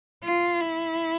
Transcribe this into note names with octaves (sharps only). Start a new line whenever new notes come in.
F4
E4